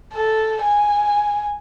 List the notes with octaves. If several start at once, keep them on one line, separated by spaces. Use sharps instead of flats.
A4
G#5